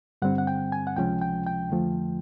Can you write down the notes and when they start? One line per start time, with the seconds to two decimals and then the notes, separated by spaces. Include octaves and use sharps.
0.22 G2 D3 G3 C4 F#5
0.38 F#5
0.47 G5
0.72 G#5
0.87 F#5
0.96 C#2 C3 F3 G#3 C#4 G5
1.22 G5
1.46 G5
1.70 F2 D3 F3 A3